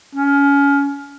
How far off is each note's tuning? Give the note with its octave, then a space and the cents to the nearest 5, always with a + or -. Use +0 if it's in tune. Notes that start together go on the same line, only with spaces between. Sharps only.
C#4 +25